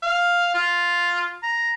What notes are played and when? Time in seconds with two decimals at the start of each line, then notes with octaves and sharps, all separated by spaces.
0.03 F5
0.54 F4
1.43 A#5